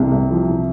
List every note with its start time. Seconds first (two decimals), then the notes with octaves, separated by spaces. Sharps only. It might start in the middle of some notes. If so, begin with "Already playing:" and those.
Already playing: C2 C3
0.11 C2
0.30 F3
0.49 C3